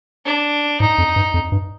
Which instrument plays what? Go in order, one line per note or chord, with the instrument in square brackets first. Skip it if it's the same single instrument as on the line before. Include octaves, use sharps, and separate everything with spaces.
[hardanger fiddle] D4
[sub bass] G#2 [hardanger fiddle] D#4
[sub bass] F2
G2
F2
G2